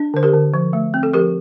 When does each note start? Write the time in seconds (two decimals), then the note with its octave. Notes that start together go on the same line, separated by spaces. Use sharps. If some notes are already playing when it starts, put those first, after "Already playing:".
Already playing: D4
0.14 D3 C5
0.23 G4 A#4
0.34 D3
0.54 F3
0.73 A3
0.94 C4
1.03 A4
1.13 F3 G4 A#4